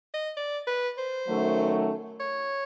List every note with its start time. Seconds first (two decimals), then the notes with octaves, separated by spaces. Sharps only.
0.14 D#5
0.37 D5
0.67 B4
0.98 C5
1.29 F#2 D#3 F#3 A3
2.20 C#5